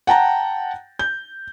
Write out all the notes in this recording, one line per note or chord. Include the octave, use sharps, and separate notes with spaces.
F#5 G5 A5 A#5
G6